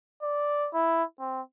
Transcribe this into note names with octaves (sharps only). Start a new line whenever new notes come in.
D5
E4
C4